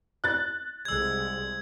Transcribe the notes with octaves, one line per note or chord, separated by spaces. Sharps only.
F#6 A6
C2 G#3 E6 G#6